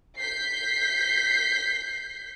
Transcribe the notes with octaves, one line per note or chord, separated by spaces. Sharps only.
G6 B6 C7